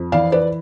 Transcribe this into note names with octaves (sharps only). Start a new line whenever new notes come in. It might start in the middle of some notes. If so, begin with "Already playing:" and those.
Already playing: F2
E3 D5 F5
B4 D5